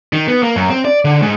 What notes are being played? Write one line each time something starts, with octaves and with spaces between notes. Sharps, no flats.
D#3
B3
A#3
F#2
C4
D5
D3
G#2